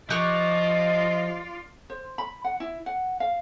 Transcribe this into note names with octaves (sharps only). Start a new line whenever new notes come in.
F3 F4 G4 D5 D#5 C#6 F#6
C5
B5
F#5
E4
F#5
F5